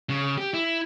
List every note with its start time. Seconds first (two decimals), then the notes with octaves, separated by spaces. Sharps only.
0.10 C#3
0.38 G4
0.54 E4